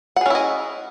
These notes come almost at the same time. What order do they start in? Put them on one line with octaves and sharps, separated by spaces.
F#5 G#4 C#4 E4 D#5